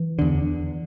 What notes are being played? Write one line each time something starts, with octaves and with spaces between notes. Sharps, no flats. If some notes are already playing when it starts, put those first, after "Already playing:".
Already playing: E3
E2 D3